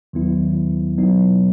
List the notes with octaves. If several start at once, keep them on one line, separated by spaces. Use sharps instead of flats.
D#2 D#3 F#3 B3 E4
B2 F#3 B3 D#4